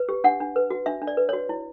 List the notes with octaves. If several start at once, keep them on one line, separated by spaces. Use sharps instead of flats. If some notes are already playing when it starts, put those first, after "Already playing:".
Already playing: B4
G4
D4 F#5
D4
B4
F#4
D4 E5
D4
D5
B4
F#4 C#5
E4